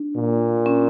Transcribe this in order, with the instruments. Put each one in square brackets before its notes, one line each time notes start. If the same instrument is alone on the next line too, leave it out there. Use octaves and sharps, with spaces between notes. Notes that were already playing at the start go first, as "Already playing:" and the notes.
Already playing: [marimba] D4
[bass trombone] A#2
[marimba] C#4